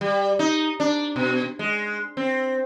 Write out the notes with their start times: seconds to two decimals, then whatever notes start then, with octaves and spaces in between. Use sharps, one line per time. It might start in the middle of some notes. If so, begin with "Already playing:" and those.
0.01 G3
0.39 D#4
0.80 D4
1.16 B2
1.59 G#3
2.17 C4